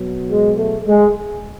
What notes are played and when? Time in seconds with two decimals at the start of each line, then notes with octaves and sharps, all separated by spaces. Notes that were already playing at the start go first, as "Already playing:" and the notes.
Already playing: B2 F#3
0.30 G#3
0.58 A3
0.87 G#3